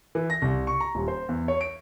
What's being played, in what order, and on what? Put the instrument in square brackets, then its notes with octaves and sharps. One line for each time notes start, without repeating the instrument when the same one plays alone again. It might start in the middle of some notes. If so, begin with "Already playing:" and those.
[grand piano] E3
A#6
C2
C#6
A#5
D#1
C5
E2
C#5
D7